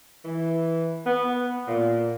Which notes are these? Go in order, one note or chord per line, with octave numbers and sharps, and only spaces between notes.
E3
B3
A#2